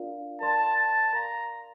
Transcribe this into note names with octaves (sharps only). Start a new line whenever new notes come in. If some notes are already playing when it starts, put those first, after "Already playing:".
Already playing: D4 F4 A#4 D5 F5
A#4 D5 F5 A5 C6
A5
A#4 D5 F5 A#5 C6